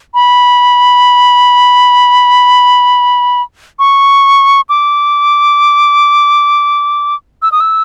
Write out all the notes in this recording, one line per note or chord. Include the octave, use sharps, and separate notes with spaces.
B5
C#6
D6
E6
D#6
E6